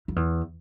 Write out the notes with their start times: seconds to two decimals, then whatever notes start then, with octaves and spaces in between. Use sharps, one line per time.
0.08 F2
0.16 E2